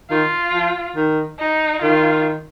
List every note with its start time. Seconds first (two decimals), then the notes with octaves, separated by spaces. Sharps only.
0.10 D#3 F4
0.54 F3
0.96 D#3
1.39 D#4
1.82 D#3 F4